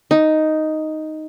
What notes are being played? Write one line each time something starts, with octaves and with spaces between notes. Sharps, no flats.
D#4